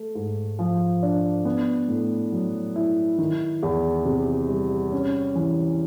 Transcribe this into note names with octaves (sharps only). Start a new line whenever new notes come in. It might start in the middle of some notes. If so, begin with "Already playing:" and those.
Already playing: A3
G#2
F3
D4
B3
A2
F#3
E4
D#3
E2
C3
G3
C#4
E3